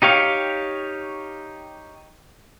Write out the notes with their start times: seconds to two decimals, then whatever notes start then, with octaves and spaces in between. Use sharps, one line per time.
0.02 D#4 G4 C#5 F5